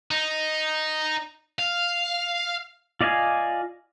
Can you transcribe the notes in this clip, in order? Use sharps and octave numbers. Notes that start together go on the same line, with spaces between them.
D#4
F5
F4 D5 D#5 F5 G#5